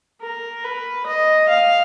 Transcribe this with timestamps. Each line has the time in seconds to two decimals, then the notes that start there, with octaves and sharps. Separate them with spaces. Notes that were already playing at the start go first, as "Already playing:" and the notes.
0.22 A#4
0.64 B4
1.07 D#5
1.49 F5